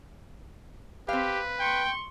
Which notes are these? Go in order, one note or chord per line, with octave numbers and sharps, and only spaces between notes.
C4 G4 B4 F5
G5 C6 C#6